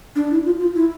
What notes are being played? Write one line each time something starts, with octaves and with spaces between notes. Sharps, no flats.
D4
E4
F4
F4
E4